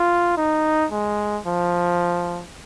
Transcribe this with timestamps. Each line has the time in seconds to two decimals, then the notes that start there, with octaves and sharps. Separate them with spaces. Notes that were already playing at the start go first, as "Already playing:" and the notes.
Already playing: F4
0.37 D#4
0.91 G#3
1.46 F3